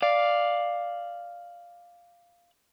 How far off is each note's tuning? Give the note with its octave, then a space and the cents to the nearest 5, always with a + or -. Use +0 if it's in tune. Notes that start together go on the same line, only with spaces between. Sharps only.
D5 +0 F5 +0